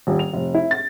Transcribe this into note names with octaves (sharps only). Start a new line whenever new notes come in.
D#1
F7
F1
E4
A6